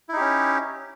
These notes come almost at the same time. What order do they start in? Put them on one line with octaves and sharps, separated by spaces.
E4 D#4 G4 C#4